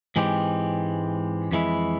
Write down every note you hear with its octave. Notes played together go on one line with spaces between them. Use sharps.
G#2 E3 G#3 C4 G4
F2 E3 G#3 E4